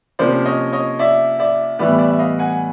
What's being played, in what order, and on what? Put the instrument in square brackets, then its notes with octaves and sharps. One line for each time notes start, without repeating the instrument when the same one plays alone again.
[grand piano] C3 F3 A#3 C#4 C5 D5
C#5 D#5
C#5 D#5
D5 E5
D5 E5
A2 E3 G3 B3 D5 E5
D5 E5
E5
D#5 F5
F#5 G#5